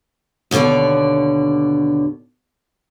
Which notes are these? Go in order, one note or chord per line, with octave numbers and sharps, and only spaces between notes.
D#2 B2 D3 C#5 D5